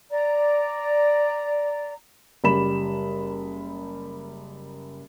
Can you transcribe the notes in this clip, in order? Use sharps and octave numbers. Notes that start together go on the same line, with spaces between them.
D5 A#5
F#1 G3 B5 E7